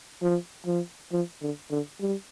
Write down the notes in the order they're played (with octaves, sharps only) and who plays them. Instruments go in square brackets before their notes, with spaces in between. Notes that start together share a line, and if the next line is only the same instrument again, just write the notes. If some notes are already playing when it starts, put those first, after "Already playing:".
[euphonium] F3
F3
F3
D3
D3
G3